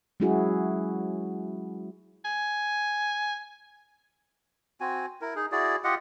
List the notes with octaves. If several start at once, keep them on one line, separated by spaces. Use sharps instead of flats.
F#3 G#3 C#4 E4 F#4 G#4
G#5
C4 F#4 G#5
E4 A#4
D#4 G#4
E4 F#4 G#4 D5
F4 G4 D#5 F#5